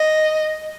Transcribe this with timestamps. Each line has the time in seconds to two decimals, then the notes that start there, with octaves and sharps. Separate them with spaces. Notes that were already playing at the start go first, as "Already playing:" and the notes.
Already playing: D#5